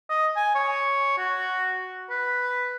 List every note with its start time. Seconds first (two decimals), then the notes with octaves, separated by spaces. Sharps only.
0.10 D#5
0.36 G#5
0.55 C#5
1.18 F#4
2.10 B4